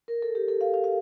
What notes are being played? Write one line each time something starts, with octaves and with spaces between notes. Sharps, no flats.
A#4
A4
G4
A4
F5
F5
F5